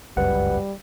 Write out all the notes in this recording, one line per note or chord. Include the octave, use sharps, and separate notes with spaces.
G1 C#2 F#2 G3 B4 F#5